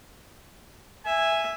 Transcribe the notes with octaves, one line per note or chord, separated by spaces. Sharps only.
E5 G#5